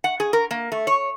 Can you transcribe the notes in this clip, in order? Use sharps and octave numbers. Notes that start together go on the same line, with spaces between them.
F#5
G#4
A#4
A#3
A3
C#5